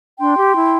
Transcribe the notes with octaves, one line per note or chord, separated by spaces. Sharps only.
D4 G5 C6
G4
E4